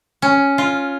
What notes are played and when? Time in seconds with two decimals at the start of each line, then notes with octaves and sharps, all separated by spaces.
0.22 C#4
0.58 F4